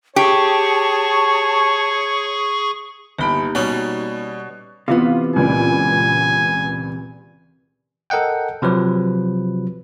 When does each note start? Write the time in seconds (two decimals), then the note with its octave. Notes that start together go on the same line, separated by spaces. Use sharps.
0.16 G4 G#4 C#5 A5 C#6
3.19 G1 A#3 D#4 G4 B5
3.55 B2 G3 C#4 D5
4.88 C3 E3 B3 F4
5.36 C#2 A#2 G#5
8.10 A4 A#4 D#5 F#5 G5
8.62 C3 F3 F#3 B4